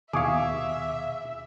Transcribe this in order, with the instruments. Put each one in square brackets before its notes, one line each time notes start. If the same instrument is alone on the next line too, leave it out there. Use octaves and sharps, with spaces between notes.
[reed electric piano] D#2 B2 [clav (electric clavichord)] G#4 [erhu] E5 [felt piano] F5 C#6 D6